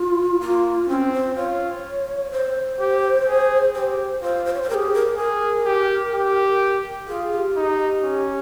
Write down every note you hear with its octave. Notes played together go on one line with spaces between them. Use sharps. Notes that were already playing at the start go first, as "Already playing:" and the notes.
Already playing: F4
A#3 F4
C4 C#4
C5
F4 C#5
C5
G4
G#4
G4 C5
F4 C5
C5
C#5
C5
G4 G#4 A#4
A#4
G#4 A#4
G4
G4
F4 G#4
G#4
G4
D#4
C#4